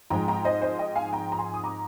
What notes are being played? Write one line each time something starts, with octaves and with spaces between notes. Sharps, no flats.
G#2 F3 G#3 G5 A#5
G5 A#5
C5 D#5
C5 D#5
D#5 G5
F5 G#5
G5 A#5
A#5
G#5 C6
D#6
A#5 D6